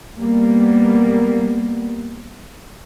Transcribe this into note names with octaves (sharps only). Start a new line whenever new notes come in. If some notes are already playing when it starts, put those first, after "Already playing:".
G3 A#3 B3